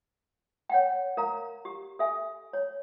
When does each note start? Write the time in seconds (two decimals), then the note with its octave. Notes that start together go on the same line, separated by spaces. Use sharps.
0.70 C#5 F#5 G5
1.17 A#4 F5 A#5
1.65 G4
1.99 A4 E5 G#5
2.53 C#5